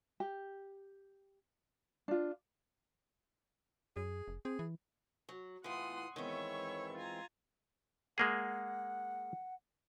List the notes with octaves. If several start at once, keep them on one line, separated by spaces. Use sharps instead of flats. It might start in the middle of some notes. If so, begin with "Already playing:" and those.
G4
D4 F4
F#2 G#4
F1
C4 G#4
E3
F#3
A2 E3 F4 F#5 C6 D#6
D#3 E3 G#3 B3 C4 C#5 E5 C#6
F4 G#5 A#5
G#3 A#3 G#4 F#5